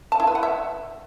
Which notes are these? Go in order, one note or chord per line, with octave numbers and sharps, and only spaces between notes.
A5
E4
B4
F#5
E5